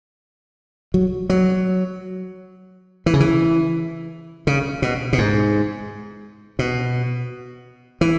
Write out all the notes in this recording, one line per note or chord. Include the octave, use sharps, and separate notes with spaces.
F#3
F#3
E3
C#3
E3
C#3
B2
B2
G#2
B2
E3